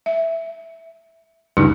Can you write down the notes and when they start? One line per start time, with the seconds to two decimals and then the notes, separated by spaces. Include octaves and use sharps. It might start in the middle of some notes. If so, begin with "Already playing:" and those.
0.06 E5
1.57 C#2 G2 D#4